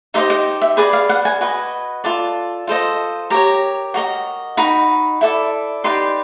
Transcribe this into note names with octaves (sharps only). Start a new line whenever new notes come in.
D#4 G4 C5 D#5 E5
D#5
E5
G#4 B4 D5 D#5
F5
F#5
G#5
F#4 B4 D#5
F4 A4 D5 A5
F4 A4 C5 D#5
G4 A#4 C#5 A#5
F#4 A#4 D#5
D#4 F#4 B5
E4 A4 D5
D#4 G4 B4 D5 C6